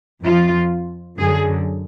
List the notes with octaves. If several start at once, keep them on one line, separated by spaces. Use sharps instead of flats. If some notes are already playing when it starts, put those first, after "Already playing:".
F2 F3 F4
F#2 D3 F#3 G#4